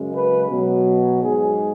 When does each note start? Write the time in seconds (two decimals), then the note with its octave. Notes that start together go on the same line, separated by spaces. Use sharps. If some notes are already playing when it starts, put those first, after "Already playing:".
Already playing: F#2 C#3 G#3
0.15 B4
0.50 B2 F#3
1.22 G#2 G#3 G#4